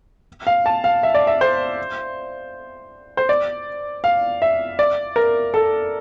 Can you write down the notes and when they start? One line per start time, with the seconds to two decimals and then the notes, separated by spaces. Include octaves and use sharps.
0.47 F5
0.66 A5
0.84 F5
1.03 E5
1.15 D5
1.27 E5
1.41 C5
3.17 C5
3.29 D5
4.04 F5
4.42 E5
4.79 D5
5.16 A#4
5.54 A4